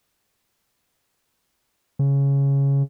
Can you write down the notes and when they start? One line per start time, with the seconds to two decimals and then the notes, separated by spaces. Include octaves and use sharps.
1.99 C#3